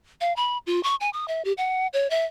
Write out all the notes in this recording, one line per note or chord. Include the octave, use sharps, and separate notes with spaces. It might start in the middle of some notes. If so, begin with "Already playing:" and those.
F5
B5
F4
C#6
G#5
D#6
E5
G4
F#5
C#5
E5